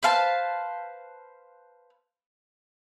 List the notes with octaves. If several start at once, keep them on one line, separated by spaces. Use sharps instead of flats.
B4 C5 F5 A5